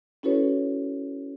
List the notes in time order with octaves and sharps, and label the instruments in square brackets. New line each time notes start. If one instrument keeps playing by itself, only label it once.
[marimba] C#4 E4 F#4 A4 B4 C#5